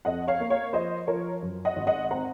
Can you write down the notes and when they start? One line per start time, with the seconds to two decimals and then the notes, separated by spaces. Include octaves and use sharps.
0.05 F2 D#5 F#5
0.28 C#5 F5
0.40 A#3
0.50 C#5 F5
0.73 F3 C5 D#5
1.07 F3 A#4 C#5
1.43 F#2
1.65 D#5 F#5
1.76 G#1
1.87 D#5 F#5
2.11 C4 F#5 A#5